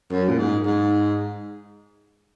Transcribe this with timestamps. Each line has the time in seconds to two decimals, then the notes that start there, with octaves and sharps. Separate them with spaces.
0.11 F#2
0.29 A#2
0.38 G#2
0.65 G#2